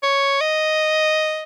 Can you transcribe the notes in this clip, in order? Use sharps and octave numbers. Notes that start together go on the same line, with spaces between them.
C#5
D#5